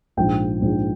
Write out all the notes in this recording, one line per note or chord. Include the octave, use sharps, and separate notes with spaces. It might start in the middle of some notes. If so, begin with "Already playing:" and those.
A#1 G#2 F3 G5
A#1 G#2 F3